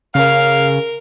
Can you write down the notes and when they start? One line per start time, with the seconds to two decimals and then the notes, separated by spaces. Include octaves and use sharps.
0.15 C#3 A#4 F5